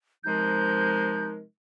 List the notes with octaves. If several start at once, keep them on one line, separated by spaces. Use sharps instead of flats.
C3 F3 G#3 D#4 A#4 G6